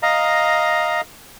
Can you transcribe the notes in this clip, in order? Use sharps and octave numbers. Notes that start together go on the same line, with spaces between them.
D#5 F5 A#5